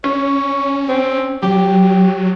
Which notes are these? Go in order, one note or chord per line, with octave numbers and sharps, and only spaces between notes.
C#4 C#5
C4
F#3 G4